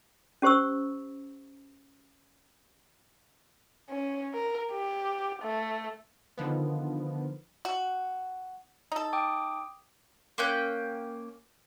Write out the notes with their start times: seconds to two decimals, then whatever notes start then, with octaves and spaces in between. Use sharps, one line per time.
0.42 C#4 G4 C5 C#6 E6
3.90 C#4
4.34 A#4
4.72 G4
5.43 A3
6.38 D3 D#3 F3 B3
7.65 F#4
8.92 D#4 A4
9.13 G5 D6 D#6
10.38 A#3 C#4 G5 F#6